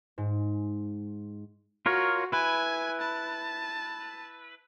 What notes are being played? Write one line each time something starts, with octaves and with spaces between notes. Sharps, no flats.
G#2
F4 F#4 A#4 C#5
E4 B4 G#5
A5